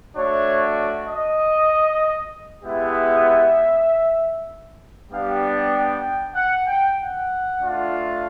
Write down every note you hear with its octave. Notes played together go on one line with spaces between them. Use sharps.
A3 D4 F#4 C#5
D#5
G#3 B3 E4 G4 E5
G3 B3 D4 G4 F5
G5
F#5
G5
F#5
A3 D4 F4